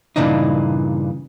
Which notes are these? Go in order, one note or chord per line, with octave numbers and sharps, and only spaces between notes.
G2 A#2 C#3 E3 D4 D#4